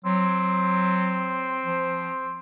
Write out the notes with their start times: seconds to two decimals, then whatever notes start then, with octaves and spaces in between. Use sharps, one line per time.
0.05 F#3 C4
1.63 F3